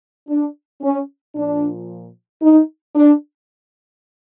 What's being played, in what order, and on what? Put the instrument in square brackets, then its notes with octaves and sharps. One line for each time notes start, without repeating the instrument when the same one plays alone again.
[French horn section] D4
C#4
A#2 F3 D4
D#4
D4